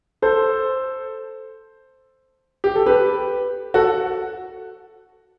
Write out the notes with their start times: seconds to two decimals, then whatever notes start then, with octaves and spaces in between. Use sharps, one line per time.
0.22 A4 C5
2.64 G4
2.75 A4
2.86 G4 B4
3.74 F#4 A4